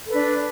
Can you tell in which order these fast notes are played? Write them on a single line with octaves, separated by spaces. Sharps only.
A4 B4 D4